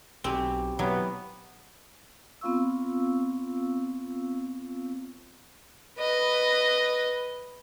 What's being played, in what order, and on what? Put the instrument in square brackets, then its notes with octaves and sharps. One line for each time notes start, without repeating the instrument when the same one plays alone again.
[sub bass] B1 [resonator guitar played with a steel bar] B2 G4 G#5 [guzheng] C4
[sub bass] B2 [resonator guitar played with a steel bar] E3 G4 [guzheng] F#3 [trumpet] B3
[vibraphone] B3 C4 F4 F5 C#6 E6
[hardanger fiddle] B4 D#5